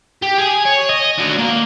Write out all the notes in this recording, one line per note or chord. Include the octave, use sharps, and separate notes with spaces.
G4
G#4 G#5
C#5
D#5
D4 F#4
A#3